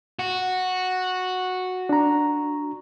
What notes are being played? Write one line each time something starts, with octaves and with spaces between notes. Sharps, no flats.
F#4
D4 A#5